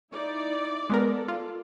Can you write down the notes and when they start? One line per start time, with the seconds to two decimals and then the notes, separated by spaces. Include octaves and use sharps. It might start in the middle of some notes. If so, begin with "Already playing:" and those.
0.12 D#4 E4 D5
0.90 G#3 B3 A4 A#4 D5
1.28 F4